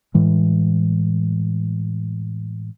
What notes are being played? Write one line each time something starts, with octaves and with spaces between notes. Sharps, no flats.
A2 E3 G#3